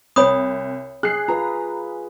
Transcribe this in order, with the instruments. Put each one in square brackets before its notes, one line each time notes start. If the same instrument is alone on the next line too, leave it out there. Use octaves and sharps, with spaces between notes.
[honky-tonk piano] C2 [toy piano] C#5 B5 D#6
[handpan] G#4 [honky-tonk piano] F#6 C7
[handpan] F4 B4 [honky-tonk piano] A#5